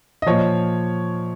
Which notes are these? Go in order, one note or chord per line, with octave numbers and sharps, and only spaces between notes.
D#5
A#2 F3 C#5